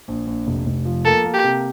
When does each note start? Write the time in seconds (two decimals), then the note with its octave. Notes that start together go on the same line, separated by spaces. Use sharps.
0.08 A#1
0.27 A#1
0.47 F1
0.66 F1
0.85 F3
1.05 A#3 A4
1.24 A#3
1.34 G4
1.44 C3